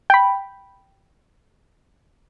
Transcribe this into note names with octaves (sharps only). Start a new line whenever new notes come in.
G5 B5